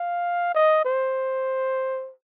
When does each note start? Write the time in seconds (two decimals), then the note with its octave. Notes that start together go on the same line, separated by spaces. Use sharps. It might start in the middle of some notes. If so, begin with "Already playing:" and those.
Already playing: F5
0.54 D#5
0.85 C5